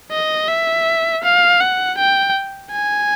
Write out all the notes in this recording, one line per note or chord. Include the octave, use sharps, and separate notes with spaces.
D#5
E5
F5
F#5
G5
G#5